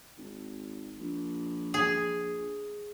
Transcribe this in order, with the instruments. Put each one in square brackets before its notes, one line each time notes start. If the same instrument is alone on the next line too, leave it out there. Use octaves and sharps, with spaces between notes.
[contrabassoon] G#1
A#1
[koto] G#4